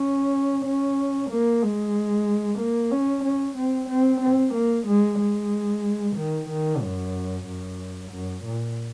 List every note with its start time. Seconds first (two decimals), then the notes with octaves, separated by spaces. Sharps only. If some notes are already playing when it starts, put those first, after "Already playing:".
Already playing: C#4
0.65 C#4
1.30 A#3
1.62 G#3
2.59 A#3
2.91 C#4
3.24 C#4
3.57 C4
3.89 C4
4.21 C4
4.54 A#3
4.87 G#3
5.19 G#3
6.16 D#3
6.49 D#3
6.82 F#2
7.45 F#2
8.10 F#2
8.44 A#2